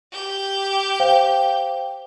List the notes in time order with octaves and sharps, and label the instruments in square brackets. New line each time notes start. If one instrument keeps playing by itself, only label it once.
[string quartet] G4 G6
[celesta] C5 F5 G5